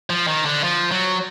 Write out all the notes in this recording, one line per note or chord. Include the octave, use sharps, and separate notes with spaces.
F3
D#3
D3
F3
F#3